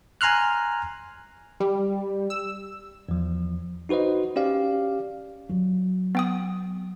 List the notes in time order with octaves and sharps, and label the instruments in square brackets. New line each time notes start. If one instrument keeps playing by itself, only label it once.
[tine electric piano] G#5 A#5 C6 F6 F#6
[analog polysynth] G3
E6
[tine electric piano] E2 F3
D#4 F#4 B4 C5 D#5
C#4 G4 D5 F5
[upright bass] F#3
[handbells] B3 G5 D#6